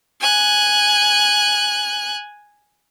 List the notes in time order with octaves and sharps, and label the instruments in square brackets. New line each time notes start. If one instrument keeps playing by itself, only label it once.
[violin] G#5 F#6